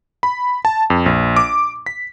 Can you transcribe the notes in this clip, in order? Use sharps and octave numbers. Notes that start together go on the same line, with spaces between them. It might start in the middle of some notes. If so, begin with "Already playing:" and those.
B5
A5
F2
A#1
D6
B6